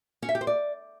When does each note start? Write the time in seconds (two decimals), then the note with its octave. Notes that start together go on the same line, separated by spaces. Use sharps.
0.22 C#4
0.29 E5
0.35 G4
0.41 C5
0.47 D5